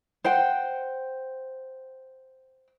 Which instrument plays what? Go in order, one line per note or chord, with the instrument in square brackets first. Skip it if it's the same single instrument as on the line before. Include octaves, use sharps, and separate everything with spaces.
[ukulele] C5 F#5 G5